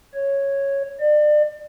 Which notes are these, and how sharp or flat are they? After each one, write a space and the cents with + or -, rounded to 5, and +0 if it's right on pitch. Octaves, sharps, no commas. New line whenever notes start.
C#5 -5
D5 +35